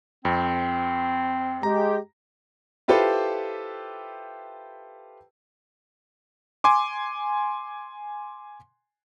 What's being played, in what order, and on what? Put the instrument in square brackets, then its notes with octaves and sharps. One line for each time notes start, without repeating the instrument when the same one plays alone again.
[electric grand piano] F2 [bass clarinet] C4
[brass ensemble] G#3 G4 [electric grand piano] A#5
[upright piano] E4 F4 G4 A4 B4 C5
[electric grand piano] G#5 C6 D6